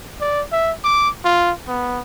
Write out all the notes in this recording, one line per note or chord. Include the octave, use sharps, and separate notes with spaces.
D5
E5
D6
F4
B3